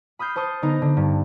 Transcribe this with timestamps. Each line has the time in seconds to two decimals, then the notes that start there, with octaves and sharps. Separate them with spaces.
0.19 B5 D#6 F6 G6 C7
0.36 C5 A5 C#6 D#6
0.62 D3 B3 D#4 A#5
0.82 D3
0.97 G2